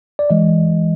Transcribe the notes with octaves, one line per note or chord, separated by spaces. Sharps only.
D5
E3 G#3 D#5